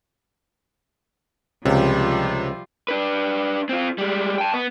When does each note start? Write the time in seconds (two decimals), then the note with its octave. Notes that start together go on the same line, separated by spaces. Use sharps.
1.65 C#2 C3 F3 G3 F4
2.88 D4 B4
3.69 C4 F4
3.98 G3 G#3
4.38 G5 A5
4.54 B3